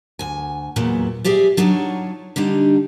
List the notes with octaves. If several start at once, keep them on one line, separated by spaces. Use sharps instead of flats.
D2 G#5
E2 A#2 E3 F#3
G#2 G4 G#4 D5 E5
F#3 D4 D#4 F4 C#5
D3 G3 D4 D#4